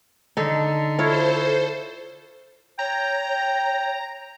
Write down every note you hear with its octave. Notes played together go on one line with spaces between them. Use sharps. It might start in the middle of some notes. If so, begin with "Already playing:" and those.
D3 D#4 A4
E4 F4 A4 C5 C#5
C#5 G5 A#5